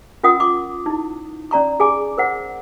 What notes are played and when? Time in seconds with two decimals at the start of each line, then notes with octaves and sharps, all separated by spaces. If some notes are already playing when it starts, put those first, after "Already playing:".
0.23 C#4 F4 A#4 F#5 D#6
0.40 C#6 D6
0.86 D#4 E4
1.51 C#4 D5 A#5 C#6
1.80 G#4 G#5 D6
2.18 A#4 C5 F#5